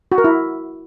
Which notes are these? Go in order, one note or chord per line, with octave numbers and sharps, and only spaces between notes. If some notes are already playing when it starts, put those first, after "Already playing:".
F#4
A#4
E4